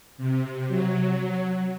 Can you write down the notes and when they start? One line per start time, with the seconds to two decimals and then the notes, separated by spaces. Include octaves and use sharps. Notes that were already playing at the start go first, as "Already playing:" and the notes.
0.18 C3
0.68 F#3